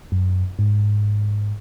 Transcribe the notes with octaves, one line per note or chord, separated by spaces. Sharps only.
F#2
G#2